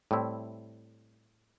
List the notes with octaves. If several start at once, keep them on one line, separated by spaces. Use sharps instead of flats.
A2 G3 C4 E4